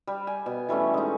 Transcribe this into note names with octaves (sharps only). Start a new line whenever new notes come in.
G3
G#5
B2
E3 G3 A3 C#4
G#3 D#4